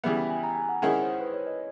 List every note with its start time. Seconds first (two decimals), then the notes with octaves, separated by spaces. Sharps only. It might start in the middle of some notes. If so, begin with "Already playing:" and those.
0.04 C#3 E3 G3 B3 E5
0.17 G5
0.30 G#5
0.43 A#5
0.56 G#5
0.69 F#5
0.82 D#3 G#3 C#4 E4 G#4 F#5
1.01 C5
1.21 B4
1.34 C#5
1.47 D#5